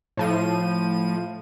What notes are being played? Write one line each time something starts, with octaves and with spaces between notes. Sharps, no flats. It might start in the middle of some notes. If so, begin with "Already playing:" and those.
A2 F3 D#7